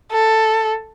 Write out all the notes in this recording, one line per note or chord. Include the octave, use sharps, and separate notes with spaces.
A4